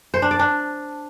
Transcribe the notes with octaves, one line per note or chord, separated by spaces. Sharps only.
C5
D4
D5
D4